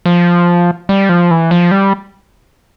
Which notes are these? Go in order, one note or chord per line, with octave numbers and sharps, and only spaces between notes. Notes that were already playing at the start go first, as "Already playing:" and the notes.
F3
G3
F3
E3
F3
G3